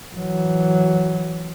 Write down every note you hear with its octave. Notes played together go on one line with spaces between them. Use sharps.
E3 F#3